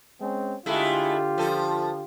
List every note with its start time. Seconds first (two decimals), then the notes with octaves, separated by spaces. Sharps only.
0.20 G#3 C4 C#4
0.66 D3 G#3 A3 E4 F4 G4
1.38 F3 A4